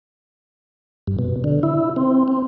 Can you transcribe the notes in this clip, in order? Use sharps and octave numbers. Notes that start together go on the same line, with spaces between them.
G2
B2
D3
E4
C4
C4